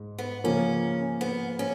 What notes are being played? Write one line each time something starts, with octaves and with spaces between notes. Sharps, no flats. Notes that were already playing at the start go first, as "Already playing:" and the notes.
Already playing: G#2
B3
C#3 F3 A#3 C#4 F4
B3
C#4